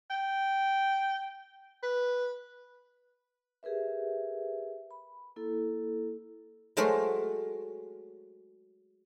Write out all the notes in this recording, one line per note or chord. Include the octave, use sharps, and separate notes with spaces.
G5
B4
G4 G#4 A#4 B4 E5
B5
A#3 E4 A4
F#3 G#3 A3 F#4 A#4 C5